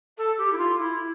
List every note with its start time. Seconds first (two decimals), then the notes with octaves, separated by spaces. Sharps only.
0.17 A4
0.37 G4
0.52 E4
0.57 F4
0.77 E4